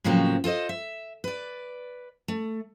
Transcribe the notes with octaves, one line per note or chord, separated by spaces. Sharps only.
A2 C#3 F3 F#3 A#3 C4
F4 A4 C5 D#5
E5
B4 D5
A3